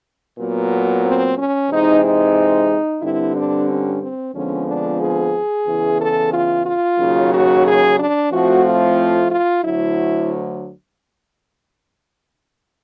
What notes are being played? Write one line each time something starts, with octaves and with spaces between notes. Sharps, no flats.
A#2 F#3 B3
C4
C#4
C3 E3 G#3 C4 D#4
D#4
G2 D3 G3 C4 E4
D4
C#4
C4
F2 D3 F3 G#3 B3 C#4
D4
G#4
E2 C#3 E3
A4
F4
F4
D#2 C#3 F#3
F#4
G#4
D4
A2 F3 A3 C4 F#4
F4
F4
D2 D3 F#3 E4